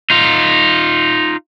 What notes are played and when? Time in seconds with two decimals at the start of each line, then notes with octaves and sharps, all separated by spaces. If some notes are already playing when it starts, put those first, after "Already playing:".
0.10 D#4 F4